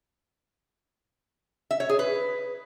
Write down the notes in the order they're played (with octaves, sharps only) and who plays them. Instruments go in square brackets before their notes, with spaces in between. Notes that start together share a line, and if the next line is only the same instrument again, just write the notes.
[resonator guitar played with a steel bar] E5
C#5
G#4
B4